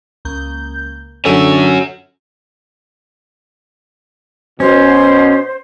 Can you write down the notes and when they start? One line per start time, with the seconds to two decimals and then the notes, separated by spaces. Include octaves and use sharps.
0.25 C#2 A#3 G6
1.25 D3 C#4 F#4 A4 F#5 E6
4.60 B2 C#4 C5